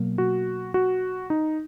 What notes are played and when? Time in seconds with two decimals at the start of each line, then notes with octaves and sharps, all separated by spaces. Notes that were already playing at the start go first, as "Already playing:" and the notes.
Already playing: B2 F#3 A#3
0.18 F#4
0.74 F#4
1.30 D#4